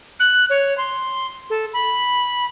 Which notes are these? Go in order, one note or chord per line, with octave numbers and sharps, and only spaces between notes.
F#6
C#5
C6
A4
B5